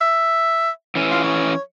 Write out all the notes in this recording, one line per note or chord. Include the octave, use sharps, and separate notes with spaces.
E5
E3 C#4
F4
C#5